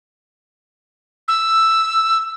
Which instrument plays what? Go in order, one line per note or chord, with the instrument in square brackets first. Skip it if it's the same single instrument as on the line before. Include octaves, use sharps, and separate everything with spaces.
[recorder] E6